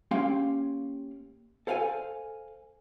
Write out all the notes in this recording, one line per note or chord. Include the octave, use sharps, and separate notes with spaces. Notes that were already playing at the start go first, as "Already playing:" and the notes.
A#3 C#4 G4 F5 G5 C6
A4 C5 F5 F#5 G#5